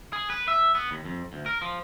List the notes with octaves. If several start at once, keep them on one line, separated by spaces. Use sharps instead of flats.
G#4
B4
E5
B3
D#2
F2
D2
A#4
F3